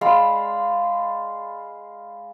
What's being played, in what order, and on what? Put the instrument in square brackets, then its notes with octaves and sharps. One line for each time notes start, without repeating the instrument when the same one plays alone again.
[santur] G#3 D5 F5 B5